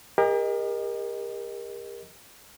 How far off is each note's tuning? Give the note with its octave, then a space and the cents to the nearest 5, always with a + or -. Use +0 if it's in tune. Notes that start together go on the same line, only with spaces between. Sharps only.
G4 +45 A#4 +15 D#5 -5